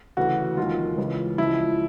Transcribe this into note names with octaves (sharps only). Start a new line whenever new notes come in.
D2 C#3 E3 F#4
E1 D#2 D#3 F#3 F4
C#2 C#3 E3
C#2 C#3 F3 E4